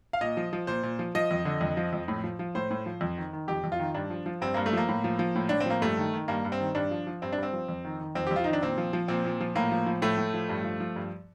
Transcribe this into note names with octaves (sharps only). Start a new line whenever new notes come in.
F5
A#2 D#5
F3
F3
A#2 C5
A#2
F3
F3 D#5
F2
D3
F2
F3
F2
A2
F3
F3
A2 C5
A2
F3
F2
D#3
D#3
F2 G4
F2
F4
D#3
G2 D4
F3
F3
G2 C4
G2 A#3
A3
F3 A#3
A2
F3
F3
A2
A2 D4
C4
F3 A#3
G2 A3
D#3
D#3
G2 A#3
G2
C4
D#3
G2 D4
F3
F3
G2 C4
D4
G2 C4
F3
F2
D#3
D#3
F2 C4
G4
F2 F4
D#3 D#4
D4
A#2 C4
F3
F3
A#2 C4
A#2
F3
A2 A#3
F3
F3
A2 A3
A2
F3
G2
F3
F3
G2